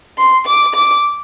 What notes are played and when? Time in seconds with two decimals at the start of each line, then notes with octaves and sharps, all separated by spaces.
0.18 C6
0.46 D6
0.75 D6